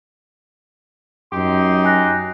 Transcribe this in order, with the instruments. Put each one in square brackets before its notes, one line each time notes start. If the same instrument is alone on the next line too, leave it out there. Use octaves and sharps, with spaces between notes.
[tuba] F#2 [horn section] D#4 G4 C6
[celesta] G#5 F#6 A#6